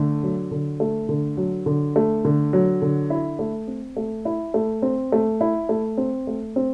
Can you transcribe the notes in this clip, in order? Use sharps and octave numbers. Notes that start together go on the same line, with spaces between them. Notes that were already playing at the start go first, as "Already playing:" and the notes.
Already playing: D3 A3
F#3
D3
A3
D3
F#3
D3
A3
D3
F#3
D3
E4
A3
C4
A3
E4
A3
C4
A3
E4
A3
C4
A3
C4